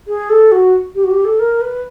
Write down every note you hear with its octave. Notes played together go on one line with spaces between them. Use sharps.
G#4
A4
F#4
G4
F#4
G4
A4
A#4
B4